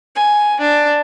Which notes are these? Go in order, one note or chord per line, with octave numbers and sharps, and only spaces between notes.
G#5
D4